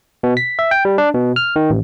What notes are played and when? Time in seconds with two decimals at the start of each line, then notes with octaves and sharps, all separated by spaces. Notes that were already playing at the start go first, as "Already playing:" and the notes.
0.23 B2
0.37 B6
0.59 E5
0.71 G5
0.85 G3
0.98 D4
1.14 B2
1.36 F6
1.56 D#3
1.70 A1